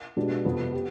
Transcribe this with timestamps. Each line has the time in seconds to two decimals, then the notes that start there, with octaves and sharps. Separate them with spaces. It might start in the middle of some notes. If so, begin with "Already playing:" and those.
0.16 B2 G#3 B3 D4 G4
0.45 F2 C3 F3 B3
0.73 G4